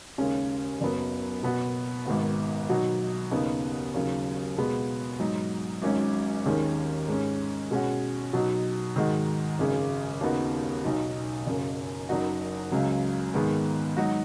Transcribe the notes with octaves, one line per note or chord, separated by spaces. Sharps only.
D#2 C#3 G#3 C#4
F#1 F#2 F#3 B3
B2 B3 F#4
G#1 G#2 D#3 B3 F#4
B2 F#3 D#4 F#4
D#2 C#3 B3 D#4
D#2 C#3 F#3
B2 G#3 B3
G#2 F#3 D#4
G#1 G#2 F#3 C#4
D#2 D#3 G#3 C#4
G#2 G#3 C#4
B2 G#3 C#4 F#4
B2 F#3 D#4 F#4
G#2 D#3 G#3 D#4 F#4
G#1 F#2 C#3 G#3
D#2 C#3 B3 D#4 F#4
B1 B2 F#3 D#4
F#1 F#2 C#3
F#1 F#2 F#3 D#4 F#4
C#2 C#3 F#3
G#2 D#3 G#3 B3
G#2 F#3 D#4 F#4